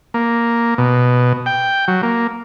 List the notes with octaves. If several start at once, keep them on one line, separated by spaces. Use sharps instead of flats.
A#3
B2
G5
F#3
A#3